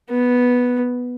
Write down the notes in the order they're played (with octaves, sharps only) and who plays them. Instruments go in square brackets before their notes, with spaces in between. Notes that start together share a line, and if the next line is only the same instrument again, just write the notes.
[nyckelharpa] B3